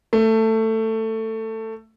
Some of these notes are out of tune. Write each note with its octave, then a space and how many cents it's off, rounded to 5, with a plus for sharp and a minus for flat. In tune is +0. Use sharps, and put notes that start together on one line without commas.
A3 +15